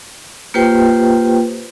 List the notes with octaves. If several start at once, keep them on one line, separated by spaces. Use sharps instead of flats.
A#3 F4 G4 B4 C5 G5